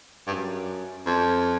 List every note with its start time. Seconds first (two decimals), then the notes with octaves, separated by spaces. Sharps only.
0.27 G2
0.30 F#2
1.06 F2